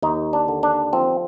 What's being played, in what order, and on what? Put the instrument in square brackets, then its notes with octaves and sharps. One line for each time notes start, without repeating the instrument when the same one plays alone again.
[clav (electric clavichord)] D#2 D#4
D4
D3
D4
F3 C4